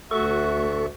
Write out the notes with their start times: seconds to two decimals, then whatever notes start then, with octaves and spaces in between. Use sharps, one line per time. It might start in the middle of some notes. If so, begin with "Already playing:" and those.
0.11 D2 A3 F#4 A4 E5 C#6